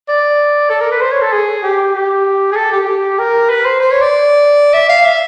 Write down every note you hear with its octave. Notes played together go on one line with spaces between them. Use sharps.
D5
A4
A#4
B4
C5
C#5
A4
G#4
G4
G4
G#4
A4
G4
G4
A#4
B4
C5
C5
C#5
D5
E5
F5
E5